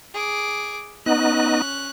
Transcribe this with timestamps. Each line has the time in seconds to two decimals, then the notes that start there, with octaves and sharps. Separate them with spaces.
0.14 G#4 D6
1.06 B3 C#4 D#4 D#5 F#6